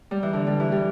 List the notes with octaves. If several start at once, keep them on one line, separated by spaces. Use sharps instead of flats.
G3
E3
D3
G3
E3
G3